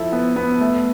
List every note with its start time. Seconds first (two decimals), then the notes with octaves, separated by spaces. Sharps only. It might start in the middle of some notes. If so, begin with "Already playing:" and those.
Already playing: F3 E4 A4
0.12 B3
0.36 B3
0.61 A3